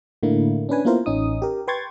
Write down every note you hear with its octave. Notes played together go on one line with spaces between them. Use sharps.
A2 D3 A#3 E4
C#4 D4 B4 G#5
A#3 B3 E4 F4 A#4 C5
A1 C#4 D#4 D#6
G4 A#4
B4 G5 C6 C#6 G#6 A6